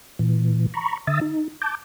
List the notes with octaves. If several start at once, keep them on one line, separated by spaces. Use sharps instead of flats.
A#2 E3
A#5 B5 C#6
D3 E5 D#6 E6 A6
D#4
A5 D6 G6